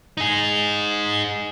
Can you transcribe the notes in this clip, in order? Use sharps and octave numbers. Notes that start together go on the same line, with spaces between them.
D#4 G#4